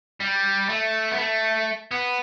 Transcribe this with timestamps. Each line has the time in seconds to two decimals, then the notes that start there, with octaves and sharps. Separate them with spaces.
0.20 G3
0.69 A3
1.11 B3
1.18 A3
1.91 B3